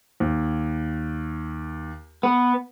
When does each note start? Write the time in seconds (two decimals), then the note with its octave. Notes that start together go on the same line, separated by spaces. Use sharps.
0.20 D#2
2.23 B3